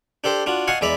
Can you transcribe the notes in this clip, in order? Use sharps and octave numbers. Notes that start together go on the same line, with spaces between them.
D4 G4 A4 C5
D4 F4 F#4
D#5 F5 F#5 G#5 A5 C#6
E2 G#3 D5 E5 A#5 B5